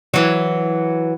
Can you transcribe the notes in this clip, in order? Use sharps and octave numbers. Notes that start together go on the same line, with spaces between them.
E3 F#3